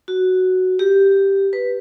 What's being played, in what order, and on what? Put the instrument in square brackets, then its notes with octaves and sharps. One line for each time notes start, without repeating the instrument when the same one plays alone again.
[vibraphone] F#4
G4
B4